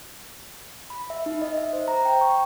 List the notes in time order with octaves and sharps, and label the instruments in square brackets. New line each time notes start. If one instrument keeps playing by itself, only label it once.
[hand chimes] B5
E5
D#4
D#5
E5
C5
A#5
G5
C#6